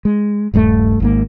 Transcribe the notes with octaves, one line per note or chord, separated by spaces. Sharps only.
G#3
D#1 G2 G3 A3
G#1 G#2 A#3